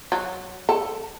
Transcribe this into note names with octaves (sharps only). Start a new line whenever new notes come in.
F#3
A4